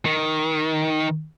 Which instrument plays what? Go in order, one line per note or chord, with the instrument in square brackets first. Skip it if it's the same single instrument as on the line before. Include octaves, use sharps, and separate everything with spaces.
[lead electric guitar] D#3